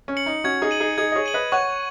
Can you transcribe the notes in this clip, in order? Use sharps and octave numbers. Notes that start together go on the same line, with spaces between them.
C#4
C#7 F#7
D#4
C#4 F#4 G#6
D#4 G#4
D#7 F#7
D#4 G#4
D#4 G#4 G#6
D#5
G#4 C#5
D#7 F#7
B4 D#5
C#5 F#5 C#6